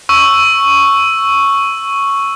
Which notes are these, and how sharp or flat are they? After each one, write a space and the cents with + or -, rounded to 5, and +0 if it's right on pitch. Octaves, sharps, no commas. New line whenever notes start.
C#6 +0 E6 +0